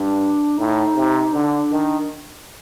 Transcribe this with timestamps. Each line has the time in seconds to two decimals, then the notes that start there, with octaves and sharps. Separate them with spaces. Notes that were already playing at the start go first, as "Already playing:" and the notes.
Already playing: G2 D4
0.57 A2 D#4
0.96 C3
1.33 D3 D4
1.71 D#3